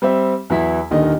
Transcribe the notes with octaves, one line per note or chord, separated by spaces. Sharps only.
G3 C4 C5 E5
E2 E3 F#3 E4 B6
D#1 D3 D#3 A#4 D#5